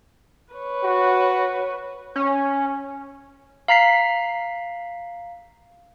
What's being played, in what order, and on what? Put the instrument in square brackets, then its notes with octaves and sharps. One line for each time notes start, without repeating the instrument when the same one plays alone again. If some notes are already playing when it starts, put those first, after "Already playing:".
[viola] B4 C#5
[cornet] F#4
[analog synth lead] C#4
[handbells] F5 A#5 B6 C7